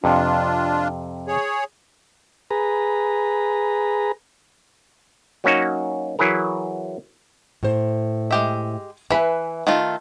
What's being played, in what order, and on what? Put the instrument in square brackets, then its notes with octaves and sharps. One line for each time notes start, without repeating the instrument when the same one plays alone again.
[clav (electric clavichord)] F2 C3 [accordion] D4 F4
[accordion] G#4 C#5
[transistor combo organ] G#4 B4 A#5
[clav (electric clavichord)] F#3 A#3 C#4 D#4 F#4
E3 F#3 E4 G#4 A#4
[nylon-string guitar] A2 C5
[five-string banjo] G#3 G4 E5
[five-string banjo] E3 B5 [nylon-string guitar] B4 E5 G#5
[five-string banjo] D#3 A3 F4